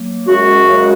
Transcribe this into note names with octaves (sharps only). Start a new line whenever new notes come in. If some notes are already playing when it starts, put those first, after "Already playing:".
Already playing: F#3 A#3
F#2 C#3 G#3 F#4
F#2 C#3 G#3